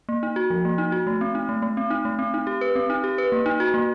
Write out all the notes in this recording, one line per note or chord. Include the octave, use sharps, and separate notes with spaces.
A#3
D#4
F#4
F3
A#3
D#4
F#4
A3
C4
D#4
A3
A3
C4
D#4
A3
C4
D#4
G4
B4
C4
D#4
G4
B4
A#3
D#4
F#4
A#3